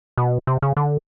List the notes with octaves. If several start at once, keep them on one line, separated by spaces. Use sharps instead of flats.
B2
C3
C#3
D3